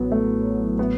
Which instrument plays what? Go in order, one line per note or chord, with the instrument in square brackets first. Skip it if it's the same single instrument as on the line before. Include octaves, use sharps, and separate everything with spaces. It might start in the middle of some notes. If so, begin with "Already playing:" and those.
Already playing: [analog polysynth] A1 A2 F#3 [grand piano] B3
[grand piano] A3
B3